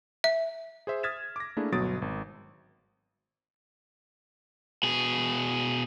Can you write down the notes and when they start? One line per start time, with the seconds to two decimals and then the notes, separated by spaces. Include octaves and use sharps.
0.24 E5
0.87 G#4 C5 E5
1.03 D#6 F6 G#6 A6 B6 E7
1.36 D6 A#6
1.57 A3 A#3 D4 E4 G#4
1.72 G1 B2 F#3 D#6 A6 D7
2.02 G#1
4.83 B2 G#4